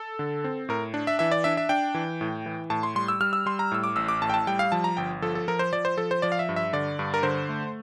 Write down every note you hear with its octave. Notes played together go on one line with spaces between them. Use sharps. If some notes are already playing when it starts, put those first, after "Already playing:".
Already playing: A4
D3
C4
A2 A#4
D4
E5
E3 E5
D5
D4 E5
E5
D4 G5
E3
A2
E3
A2 A5
C6
G3 C6
E6
G3 F6
E6
G3 C6
A#5
A2 E6
D6
A1 E6
D6
A2 A5
G5
A5
G3 G5
F5
F3 A5
A#5
G1 G5
F3 A4
A4
F3 A#4
C5
F3 D5
C5
F3 A4
C5
F3 D5
F5
E5
G2
E5
D3 D5
G2
A#4
D3 C5
A3